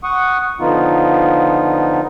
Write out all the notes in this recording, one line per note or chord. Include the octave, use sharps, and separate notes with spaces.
F#5 C#6 D#6
D3 F3 B3 D#4 F4